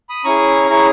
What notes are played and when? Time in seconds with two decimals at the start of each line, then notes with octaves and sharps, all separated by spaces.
0.09 B5 D#6
0.24 C#4 E4 G#4 A#5 C#6
0.70 C#4 E4 G#4 A#5 C#6